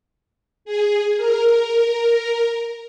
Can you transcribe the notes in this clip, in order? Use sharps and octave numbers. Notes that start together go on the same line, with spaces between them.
G#4
A#4